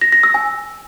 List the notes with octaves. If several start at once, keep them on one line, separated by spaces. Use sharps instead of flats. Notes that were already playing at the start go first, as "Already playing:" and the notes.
A#6
A#6
E6
G#5